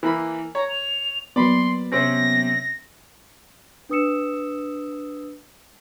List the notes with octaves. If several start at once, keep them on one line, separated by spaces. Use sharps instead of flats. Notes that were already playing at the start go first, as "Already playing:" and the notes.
E3 A#3 B5
C#5 A#5
F7
F#3 A#3 B3 D5 B5 C6
C3 C4 C#4 A#6
D4 B4 D#6 E6 C#7 E7